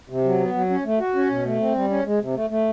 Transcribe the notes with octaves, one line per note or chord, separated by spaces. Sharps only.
C3
F#3
B3
F#3
C#4
A3
F#4
C#4
B2
A3
C4
G3
C#4
G#3
C3
A3
A3